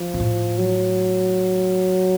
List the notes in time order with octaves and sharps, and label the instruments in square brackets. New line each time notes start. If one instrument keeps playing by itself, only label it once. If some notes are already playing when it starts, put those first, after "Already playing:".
Already playing: [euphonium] F3
[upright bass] A#2
A2
[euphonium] F#3